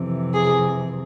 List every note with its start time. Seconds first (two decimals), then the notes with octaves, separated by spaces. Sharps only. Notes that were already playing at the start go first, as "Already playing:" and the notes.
Already playing: F2 C3 E3
0.34 G#4